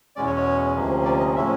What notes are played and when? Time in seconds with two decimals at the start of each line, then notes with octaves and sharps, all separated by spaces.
0.16 E2 B2 G#3 C#4 D5
0.26 C#5
0.37 C#5
0.76 D2 C3 F3 A#3 C#4
1.05 D5
1.20 D#5
1.35 A2 F3 G#3 C#4 E5